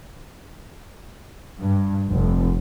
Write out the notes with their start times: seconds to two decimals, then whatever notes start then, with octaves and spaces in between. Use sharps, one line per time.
1.60 G2
2.11 F1